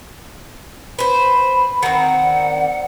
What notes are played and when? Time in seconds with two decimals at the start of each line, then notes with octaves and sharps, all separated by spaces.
0.99 B4 C5 B5
1.83 D#3 C4 F#5
2.22 D5